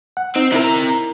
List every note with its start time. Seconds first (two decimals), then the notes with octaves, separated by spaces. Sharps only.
0.17 F#5
0.36 C4 D#4
0.52 C3 D#4 E4 A#4 A#5